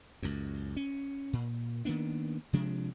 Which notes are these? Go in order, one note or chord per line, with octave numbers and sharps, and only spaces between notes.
C#2 F#2
C#4
A#2
D#3 A#3 B3 D4
C3 F3 G#3 D4